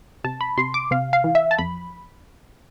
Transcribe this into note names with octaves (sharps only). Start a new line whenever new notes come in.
C3 A5
B5
C3 C6
D6
C3 F5
F5
E3
E5
A5
F2 B5